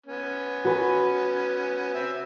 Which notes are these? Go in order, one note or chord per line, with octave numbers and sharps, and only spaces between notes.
B3 C#4
F#4 B4 G#5
C4 E5